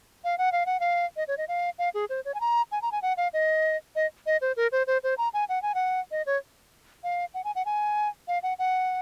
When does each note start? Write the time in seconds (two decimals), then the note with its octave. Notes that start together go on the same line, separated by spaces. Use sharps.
0.24 F5
0.38 F#5
0.52 F5
0.66 F#5
0.80 F5
1.17 D#5
1.28 C#5
1.38 D#5
1.48 F5
1.79 F5
1.94 G#4
2.10 C5
2.25 C#5
2.34 G#5
2.41 A#5
2.72 G#5
2.82 A#5
2.92 G#5
3.02 F#5
3.17 F5
3.33 D#5
3.96 D#5
4.26 D#5
4.41 C5
4.57 A#4
4.72 C5
4.87 C5
5.04 C5
5.18 A#5
5.34 G#5
5.49 F#5
5.62 G#5
5.75 F#5
6.11 D#5
6.26 C#5
7.04 F5
7.34 F#5
7.44 G#5
7.55 F#5
7.66 G#5
8.28 F5
8.43 F#5
8.59 F#5